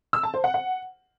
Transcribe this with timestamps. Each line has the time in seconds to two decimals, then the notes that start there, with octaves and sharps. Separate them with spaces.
0.13 E6
0.23 A5
0.34 C5
0.44 F#5
0.54 F#5